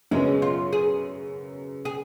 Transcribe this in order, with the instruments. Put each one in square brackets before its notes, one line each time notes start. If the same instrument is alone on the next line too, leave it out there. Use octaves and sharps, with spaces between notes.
[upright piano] F#2 C#3 F#3 B3 [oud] G#3
[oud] F4
G#4
G#4